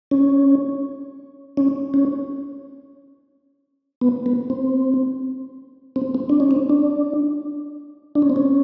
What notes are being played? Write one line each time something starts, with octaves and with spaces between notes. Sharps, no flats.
C#4
C#4
C#4
B3
B3
C4
C4
C4
D4
C#4
C4
D4
D4
C#4
C4
C#4